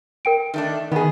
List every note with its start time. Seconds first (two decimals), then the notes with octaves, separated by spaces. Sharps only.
0.25 A#4 G5 D7
0.54 D#3 A3 D4
0.92 D#3 B3 G#4